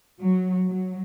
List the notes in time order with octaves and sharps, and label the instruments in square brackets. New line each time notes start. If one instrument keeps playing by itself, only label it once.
[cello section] F#3
F#3